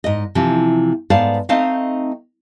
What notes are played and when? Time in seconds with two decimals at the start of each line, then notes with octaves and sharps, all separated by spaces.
0.04 G#2 D#5
0.35 C3 E3 F3
1.10 G#2 B3 C5 D5 F5 A5
1.49 A3 C4 D#4 C5 D#5 F5